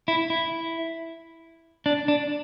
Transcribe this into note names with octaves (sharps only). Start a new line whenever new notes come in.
E4
E4
D4
D4